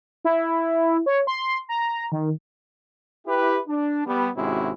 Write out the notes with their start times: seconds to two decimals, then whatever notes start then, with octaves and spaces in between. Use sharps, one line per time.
0.25 E4
1.06 C#5
1.27 C6
1.69 A#5
2.12 D#3
3.27 E4 G4 B4
3.68 D4
4.06 G3 B3
4.36 G#1 C3 G#3 C#4 E4 F#4